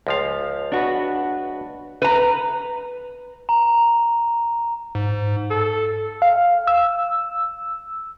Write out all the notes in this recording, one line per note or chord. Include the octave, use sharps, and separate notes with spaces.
C#2 F3 F5
D4 F#4 B4
B4 A#5
A#5
G#2
A4
F5
E6